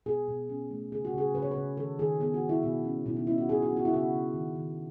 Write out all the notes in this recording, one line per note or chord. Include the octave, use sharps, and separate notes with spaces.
B2 G#4
B2
C#4
A3
C#3 G#4
F#4
C#3 G#4
C#3 B4
C#5
B4
C#3
D#3 A4
D#3 G#4
B3 G#4
F#4
D#3
E4
B2 F#4
C#4
B2 E4
D#4
C#4 E4
F#4
B3 G#4
F#4
B3
F#4
E4
C#3 F#4
C#3
D#3
D#3